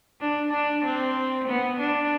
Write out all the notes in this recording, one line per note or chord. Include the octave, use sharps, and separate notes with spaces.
D4
D4
C4
B3
D4